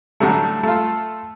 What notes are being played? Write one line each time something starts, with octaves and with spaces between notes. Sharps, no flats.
A2 D3 F#3 G3 A3
A3 F4